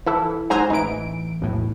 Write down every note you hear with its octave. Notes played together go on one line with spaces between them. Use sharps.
E3 E4 A4
G#2 F#3 C5 G#5 A#5
A1 E3 D#4 D7
B1 E2 A2